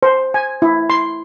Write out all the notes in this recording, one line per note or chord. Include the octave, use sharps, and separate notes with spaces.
C5
G#5
E4
C6